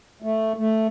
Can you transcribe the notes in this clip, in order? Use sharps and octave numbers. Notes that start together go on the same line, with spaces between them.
A3
A3